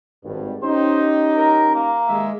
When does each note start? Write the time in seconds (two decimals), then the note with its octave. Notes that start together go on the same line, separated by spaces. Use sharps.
0.23 G#1 G2
0.62 C#4 D#4 G4 C5
1.37 A#4
1.75 A#3
2.08 D#2 G#3 E5